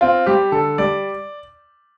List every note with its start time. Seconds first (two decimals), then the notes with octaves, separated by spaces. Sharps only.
0.01 C4 F4
0.26 G3 G4
0.52 D3 A4
0.78 G3 D5